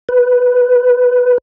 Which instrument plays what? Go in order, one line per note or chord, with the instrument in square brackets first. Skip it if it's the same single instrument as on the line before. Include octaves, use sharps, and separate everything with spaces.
[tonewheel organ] B4